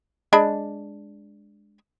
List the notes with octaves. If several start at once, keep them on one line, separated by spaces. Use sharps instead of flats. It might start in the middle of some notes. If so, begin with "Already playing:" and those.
G#3 D4 B5